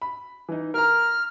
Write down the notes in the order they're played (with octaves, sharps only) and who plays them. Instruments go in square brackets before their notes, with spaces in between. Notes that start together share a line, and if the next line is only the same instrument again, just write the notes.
[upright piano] B5
E3 D#4
[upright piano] A#4 A#5 [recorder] F6